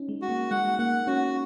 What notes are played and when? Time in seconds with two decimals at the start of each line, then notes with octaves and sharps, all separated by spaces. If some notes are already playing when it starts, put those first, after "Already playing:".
Already playing: C#4 D#4
0.09 G#3
0.22 F#4
0.29 A#3
0.51 G#3 F#5
0.79 A#3 F#5
1.07 C#4 F#4